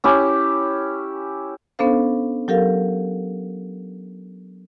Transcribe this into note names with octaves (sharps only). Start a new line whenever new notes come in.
C#4 E4 G4
B3 C#4 D4 A4 C5 F5
F#3 G4 A4 A#4 F5